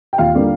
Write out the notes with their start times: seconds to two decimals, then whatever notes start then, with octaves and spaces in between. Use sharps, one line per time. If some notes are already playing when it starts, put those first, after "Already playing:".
0.13 G5
0.18 D#2 F4 F5
0.35 D3 G3 A#3